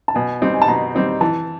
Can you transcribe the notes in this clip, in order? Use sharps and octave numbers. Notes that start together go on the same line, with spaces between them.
A5
B2 G#5
G3 C4 D#4
G#5
A5
B2 A#5
G3 C4 D#4
E3 A5